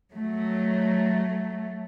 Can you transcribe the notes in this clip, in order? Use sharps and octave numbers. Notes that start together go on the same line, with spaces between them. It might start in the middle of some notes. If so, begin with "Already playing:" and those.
F#3 A3